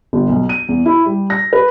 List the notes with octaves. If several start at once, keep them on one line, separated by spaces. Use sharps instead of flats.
G1
B1
D#7
E2
E4
G3
A#6
B4